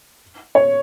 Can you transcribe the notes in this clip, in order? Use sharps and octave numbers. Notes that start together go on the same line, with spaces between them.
C#5